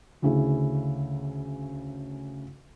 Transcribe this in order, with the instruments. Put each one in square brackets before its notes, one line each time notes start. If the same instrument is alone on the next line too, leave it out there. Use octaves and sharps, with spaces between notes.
[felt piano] D2 C#3 C#4 E4 G#4